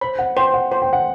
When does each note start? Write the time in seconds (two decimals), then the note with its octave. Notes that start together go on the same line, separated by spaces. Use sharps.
0.01 C5 B5
0.19 F#5
0.37 C5 G5
0.54 F#5
0.72 C5
0.82 G5
0.93 F#5